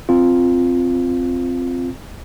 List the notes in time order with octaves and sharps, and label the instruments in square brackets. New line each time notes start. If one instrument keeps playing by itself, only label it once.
[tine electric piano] C4 F4